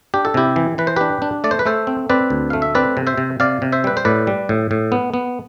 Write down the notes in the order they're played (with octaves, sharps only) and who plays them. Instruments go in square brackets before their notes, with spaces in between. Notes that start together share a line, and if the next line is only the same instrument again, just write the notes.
[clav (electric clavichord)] D4 G4
A4
C3 E4 G4
E3
E3 B4
C5
D4 G4 B4
D4
A3 D5
C5
B4
A3 A4 C5
C4
C4 B4 D5
D2
A3 F5
E5
C4 B4 D5
C3
C5 E5
C3
C3 D5 F5
C3
C5 E5
G3 B4
C5
A2 B4 D5
G3
A2
A2
B3
B3